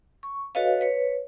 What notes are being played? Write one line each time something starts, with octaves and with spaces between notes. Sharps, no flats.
C#6
F#4 A4 B4 C#5 D#5 F5
B4 C#5